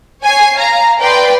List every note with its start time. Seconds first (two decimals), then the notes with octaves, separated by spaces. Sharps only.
0.22 C#5 G#5 C7
0.56 F5 A#5
1.00 B4 D5 G5 C6